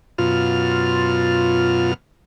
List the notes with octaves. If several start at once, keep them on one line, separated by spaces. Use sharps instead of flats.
F#2 B2 F4 F6